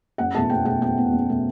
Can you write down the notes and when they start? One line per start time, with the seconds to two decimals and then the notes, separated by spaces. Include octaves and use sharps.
0.18 F#1 F#5
0.34 E2 B2 A3 A5
0.50 F#1 G5
0.65 E2 B2 A3 G5
0.81 F#1 G5
0.97 E2 B2 A3
1.12 F#1
1.29 B2 A3